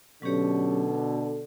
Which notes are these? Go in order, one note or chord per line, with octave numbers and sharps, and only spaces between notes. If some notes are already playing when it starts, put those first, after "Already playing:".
B2 D3 F#3 C#4 G4 C#5